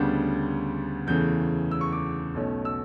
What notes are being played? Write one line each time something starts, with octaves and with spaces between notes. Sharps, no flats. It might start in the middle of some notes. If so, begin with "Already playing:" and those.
Already playing: D2 C#3 G3 B3 D4 G6
E2 C#3 E3 A3 G6
E6
C#6
D6
B1 B2 A3 C#4
E6